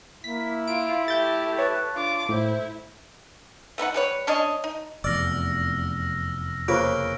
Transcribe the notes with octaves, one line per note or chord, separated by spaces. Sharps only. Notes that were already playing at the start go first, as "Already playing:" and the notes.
A#3 E4 B6
F4 D7
A3 G4 E5 G6 A6
B4 C#5 A5
D4 F4 D6
A2 E4 C5
A3 B3 D#4 F#5
G3 B4 C#5
C#4 D4 C#5 D#5
D#4
F1 E2 D5 E6 F6 A#6
C#3 A#3 F4 B4 C5 F6 D7